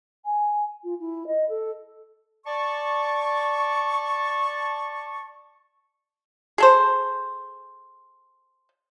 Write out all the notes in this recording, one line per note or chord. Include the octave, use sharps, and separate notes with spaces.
G#5
F4
E4
D#5
A4
D5 A5 C#6
G#4 A4 C5